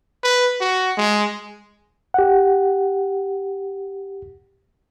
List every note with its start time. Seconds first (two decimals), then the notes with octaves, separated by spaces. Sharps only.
0.23 B4
0.61 F#4
0.98 G#3
2.14 G4 F#5